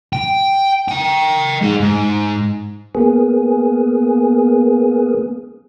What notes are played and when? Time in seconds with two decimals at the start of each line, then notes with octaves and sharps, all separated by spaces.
0.13 G5
0.89 D#5 G5
1.62 G#3 D#4
1.80 G#2
2.95 A#3 B3 G#4